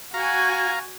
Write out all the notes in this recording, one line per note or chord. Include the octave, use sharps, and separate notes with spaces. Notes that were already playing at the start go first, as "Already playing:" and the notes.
F#4 F5 G#5 A#5